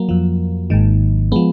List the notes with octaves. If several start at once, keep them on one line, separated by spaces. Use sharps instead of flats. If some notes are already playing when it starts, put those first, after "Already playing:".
Already playing: F#3 A#3
F2 F3
G#1 G#2 D#3
F3 G#3 B3